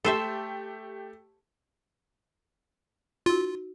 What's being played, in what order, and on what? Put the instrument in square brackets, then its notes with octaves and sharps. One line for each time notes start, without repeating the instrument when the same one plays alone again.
[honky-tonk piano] A3 G4 [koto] A4 C5 E5
[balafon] D#4 F#4 [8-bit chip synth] F4